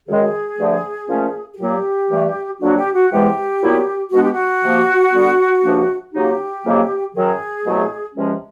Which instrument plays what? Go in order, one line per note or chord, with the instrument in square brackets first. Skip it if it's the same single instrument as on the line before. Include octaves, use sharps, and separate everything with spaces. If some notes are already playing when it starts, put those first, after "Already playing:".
[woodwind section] F#2 D#3 G#3 [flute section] G#4
[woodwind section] G2 D3 F3 A3
A#2 F3 A3 C#4
[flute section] G#4
[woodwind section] A#2 F#3 A#3 [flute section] G4
[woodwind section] G2 E3 A3
[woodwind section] F2 D3 F#3 A#3 D4 [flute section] F#4
[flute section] G4
F#4
[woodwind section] E2 C3 E3 G#3 B3 [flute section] G4
[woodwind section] A#2 F#3 B3 E4
[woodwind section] B2 G#3 B3 D4 [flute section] F#4
[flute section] G4
F#4
[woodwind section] C3 F3 A#3
D3 G3 B3
C#2 C3 F3 A#3 D4
[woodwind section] C#3 F#3 A#3 D#4 [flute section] G4
[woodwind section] F2 C#3 F#3 A#3 D#4
[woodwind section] F#2 D#3 F#3 [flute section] G#4
[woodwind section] C2 B2 F#3 A3
C#2 C3 F3 G#3 C#4